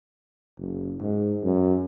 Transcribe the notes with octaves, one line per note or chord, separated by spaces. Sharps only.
F#1
G#2
F#2